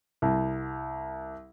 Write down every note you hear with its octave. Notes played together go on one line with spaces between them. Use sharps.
C2